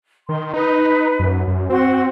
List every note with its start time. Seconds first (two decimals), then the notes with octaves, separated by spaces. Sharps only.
0.29 D#3 C6
0.53 D#4 B4
1.19 F#2
1.47 F#2
1.70 C4 F#4 F#5 C6